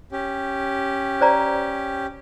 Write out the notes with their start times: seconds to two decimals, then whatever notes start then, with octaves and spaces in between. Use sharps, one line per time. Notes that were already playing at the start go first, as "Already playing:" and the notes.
0.12 C#4 G4
1.21 C5 D5 A#5